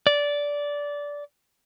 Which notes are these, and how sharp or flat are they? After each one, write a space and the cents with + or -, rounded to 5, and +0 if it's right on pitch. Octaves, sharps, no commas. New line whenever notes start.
D5 -15